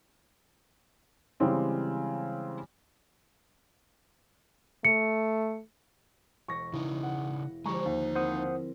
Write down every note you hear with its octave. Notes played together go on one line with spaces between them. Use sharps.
C#3 E3 G3 G#3 C4 C#4
A3 C#7
E1 C#6 A#6
C#3 D#4 E4
F#5
D3 F3 G#3 G4 A#5 C#6
D#2 D#4
C4 E4 A#4 C5 F#5 D#6